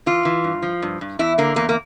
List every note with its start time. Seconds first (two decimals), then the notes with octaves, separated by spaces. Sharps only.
0.06 E3 F4
0.25 E3
0.44 G2
0.63 F3
0.82 G2
1.01 G2
1.19 E2 E4
1.38 D3 A#3
1.56 E2 A#3
1.69 A#3